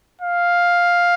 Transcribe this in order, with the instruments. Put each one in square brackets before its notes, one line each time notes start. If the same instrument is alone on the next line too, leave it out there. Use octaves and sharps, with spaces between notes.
[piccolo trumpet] F5